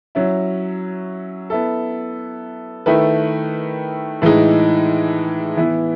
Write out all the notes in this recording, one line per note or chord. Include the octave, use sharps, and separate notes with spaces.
F#3 C#4 E4
B3 E4 A4
D#3 A3 E4 B4
A2 E3 G#3 D#4
E3 B3 E4